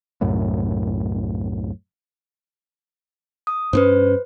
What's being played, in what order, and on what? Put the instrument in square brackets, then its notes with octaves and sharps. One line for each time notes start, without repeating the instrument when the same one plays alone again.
[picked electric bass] C2 F#2 A2
[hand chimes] D#6
[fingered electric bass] G2 C4 C#4 [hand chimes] B4 C5